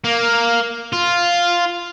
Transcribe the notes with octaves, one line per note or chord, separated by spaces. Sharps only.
A#3
F4